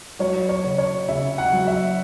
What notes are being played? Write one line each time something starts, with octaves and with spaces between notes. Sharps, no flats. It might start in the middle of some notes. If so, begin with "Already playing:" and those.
F#3 C#5
C#5
C#3
C#5
C#3 E5
F#5
F#3
E5